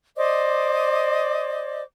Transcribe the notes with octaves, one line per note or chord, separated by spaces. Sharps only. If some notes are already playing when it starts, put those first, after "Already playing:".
C5 D5 D#5 D6